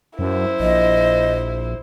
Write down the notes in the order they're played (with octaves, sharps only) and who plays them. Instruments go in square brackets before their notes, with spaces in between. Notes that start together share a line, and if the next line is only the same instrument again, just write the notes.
[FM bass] F#2 [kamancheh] E4 C5
[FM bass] A#1 [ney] D#5